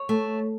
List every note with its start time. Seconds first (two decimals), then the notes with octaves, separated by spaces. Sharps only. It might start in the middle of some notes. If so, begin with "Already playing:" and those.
Already playing: C#5
0.09 A3